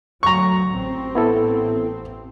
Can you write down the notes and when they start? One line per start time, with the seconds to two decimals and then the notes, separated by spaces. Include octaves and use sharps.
0.23 D2 F#3 A#5 C#6
0.71 A1 C4
1.15 B3 E4 A4